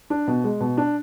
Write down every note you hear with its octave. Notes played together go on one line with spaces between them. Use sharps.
D4
B2
G#3
B2
D4